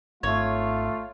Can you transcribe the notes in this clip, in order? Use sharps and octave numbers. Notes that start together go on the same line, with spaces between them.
G#1 A3 F4 C#5